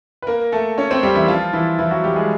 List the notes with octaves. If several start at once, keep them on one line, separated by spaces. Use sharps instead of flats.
B4
A#3 A#4
A3 A4
C#4 C#5
C4 C5
G3 G4
E3 E4
F3 F4
E3 E4
E3 E4
F#3 F#4
G3 G4
G#3 G#4